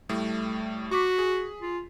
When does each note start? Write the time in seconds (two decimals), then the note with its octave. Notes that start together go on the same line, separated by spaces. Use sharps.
0.09 A2 G3 A3
0.91 F#4 C#6 D6 B6
1.18 G#4
1.62 F4